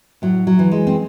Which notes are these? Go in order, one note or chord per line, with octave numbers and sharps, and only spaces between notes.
A2 F#3
F#3
E3
G#3
C4